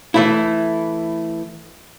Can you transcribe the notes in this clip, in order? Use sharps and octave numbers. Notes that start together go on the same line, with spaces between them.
E3 A3 E4